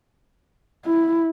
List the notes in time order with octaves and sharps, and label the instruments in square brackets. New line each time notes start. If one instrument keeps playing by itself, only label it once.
[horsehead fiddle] E4